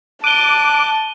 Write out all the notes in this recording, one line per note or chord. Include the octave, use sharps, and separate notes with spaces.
A5 D6 F#6 D#7 G7